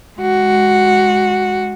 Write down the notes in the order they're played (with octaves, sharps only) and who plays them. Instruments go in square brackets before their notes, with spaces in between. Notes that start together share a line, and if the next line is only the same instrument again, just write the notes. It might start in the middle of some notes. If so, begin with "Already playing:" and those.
[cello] G#3 F#4